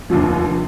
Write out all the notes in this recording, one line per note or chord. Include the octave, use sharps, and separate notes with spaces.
F1 D#2 D3 F3